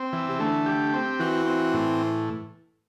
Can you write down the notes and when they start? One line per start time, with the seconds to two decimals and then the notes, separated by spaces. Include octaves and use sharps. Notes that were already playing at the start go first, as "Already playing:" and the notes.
Already playing: C4
0.13 E3
0.29 C3
0.39 D3 A3
0.66 G4
0.94 C4
1.20 E3 F#4
1.47 C4
1.74 A2